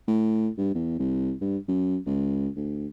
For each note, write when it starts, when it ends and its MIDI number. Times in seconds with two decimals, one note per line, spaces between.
0.08 0.49 45
0.58 0.73 43
0.74 0.95 40
0.99 1.32 36
1.41 1.58 43
1.68 1.98 42
2.06 2.48 37
2.56 2.87 38